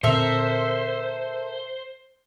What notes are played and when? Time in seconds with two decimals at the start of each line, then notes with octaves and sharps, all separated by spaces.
0.03 A#2 D3 C4 A4 A#4 C5 E5